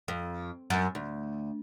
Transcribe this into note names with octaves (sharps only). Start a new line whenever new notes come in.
F2
F#2
D2